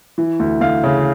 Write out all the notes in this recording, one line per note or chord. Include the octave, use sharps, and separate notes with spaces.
E3
D2
D2 F5
C#3